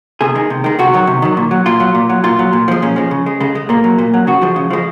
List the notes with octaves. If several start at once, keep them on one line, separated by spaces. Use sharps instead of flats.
C3 G#4
D#3 G#3
C3
D#3 G#3
C3 F#4
D#3 F#3
C3
D#3 F#3
A#2
F#3
A#2 F4
F#3
A#2
F#3
A#2 F4
F#3
A#2
F3 G#3
A#2 C#4
F3 G#3
C#3
G#3
C#3 G#3
G#3
A#2 A#3
F#3
A#2
F#3
C#3 F#4
F3 G#3
C#3
F3 G#3